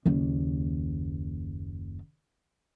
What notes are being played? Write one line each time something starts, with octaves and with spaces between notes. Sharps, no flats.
F#1 D#2